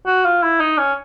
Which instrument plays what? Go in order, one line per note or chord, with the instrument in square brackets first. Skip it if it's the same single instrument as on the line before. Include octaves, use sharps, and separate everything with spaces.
[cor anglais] F#4
F4
E4
D#4
C#4